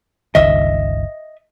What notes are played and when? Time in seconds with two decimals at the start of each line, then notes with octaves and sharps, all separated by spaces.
0.35 G1 C#2 D#3 D#5 E5